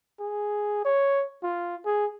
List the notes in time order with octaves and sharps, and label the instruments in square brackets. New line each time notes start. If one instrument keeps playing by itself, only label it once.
[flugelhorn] G#4
C#5
F4
G#4